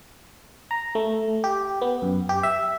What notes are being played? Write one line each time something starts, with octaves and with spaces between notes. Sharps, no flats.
A#5
A3
G4
B3
F#2
G4
E5